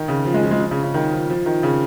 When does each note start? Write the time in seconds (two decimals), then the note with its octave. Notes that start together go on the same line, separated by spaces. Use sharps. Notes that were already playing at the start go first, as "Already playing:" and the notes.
Already playing: D#3
0.08 C#3
0.25 F3
0.34 G#3
0.43 F3
0.51 G#3
0.60 F3
0.71 C#3
0.83 C#3
0.94 D#3
1.12 F3
1.30 F3
1.46 D#3
1.63 C#3